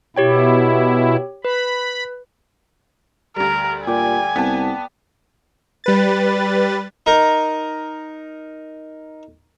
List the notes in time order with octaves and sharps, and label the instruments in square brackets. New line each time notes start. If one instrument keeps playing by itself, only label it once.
[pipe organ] B2 E4 [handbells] G4 C#5 G5
[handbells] B4 [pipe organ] B5
[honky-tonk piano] D2 G3 [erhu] A#4
[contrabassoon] A#2 [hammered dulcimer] G4 D5 [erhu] G#5
[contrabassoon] C2 [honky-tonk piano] B3 A5
[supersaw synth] G3 B4 A6
[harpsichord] D#4 A#4